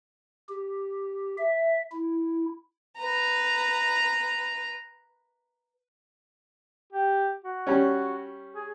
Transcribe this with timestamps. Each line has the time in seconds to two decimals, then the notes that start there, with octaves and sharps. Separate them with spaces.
0.49 G4
1.37 E5
1.92 E4
2.98 B4 A#5
6.93 G4
7.44 F#4
7.67 G3 C#4
8.56 G#4